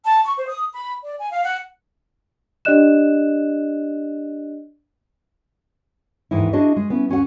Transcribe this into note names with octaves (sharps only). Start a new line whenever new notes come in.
A5
C#6
C5
D#6
B5
D5
G#5
F5
F#5
D4 G4 D5 D#5 F#6 E7
D#2 G#2 E3 D#4 E4
D4 E4 F#4 G#4 D#5
G#3
B3 C#4 E4
D2 C#4 F#4 F#5